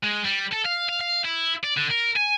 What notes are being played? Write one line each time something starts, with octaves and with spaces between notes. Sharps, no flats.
G#3
G3
A4
F5
F5
F5
E4
D5
D3
A#4
G#5